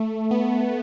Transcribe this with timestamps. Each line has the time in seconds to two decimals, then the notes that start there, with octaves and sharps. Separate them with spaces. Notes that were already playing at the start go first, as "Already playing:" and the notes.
Already playing: A3
0.31 B3